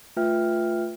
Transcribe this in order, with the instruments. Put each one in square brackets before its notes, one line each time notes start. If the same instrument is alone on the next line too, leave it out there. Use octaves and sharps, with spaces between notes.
[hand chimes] A3 F4 B4 E5 G5 F6